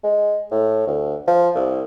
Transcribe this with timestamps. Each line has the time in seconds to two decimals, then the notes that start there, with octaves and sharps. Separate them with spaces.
0.04 G#3
0.51 A2
0.87 D2
1.28 F3
1.55 C2